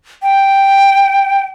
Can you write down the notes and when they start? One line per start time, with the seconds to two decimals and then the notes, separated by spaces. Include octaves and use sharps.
0.22 G5